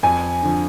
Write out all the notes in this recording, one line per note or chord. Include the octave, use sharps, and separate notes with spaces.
F2 G#5
D3 F3